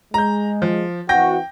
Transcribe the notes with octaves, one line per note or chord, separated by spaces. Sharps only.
G#3 A#5 G6
F3
E3 C4 F#4 G5 G6 A#6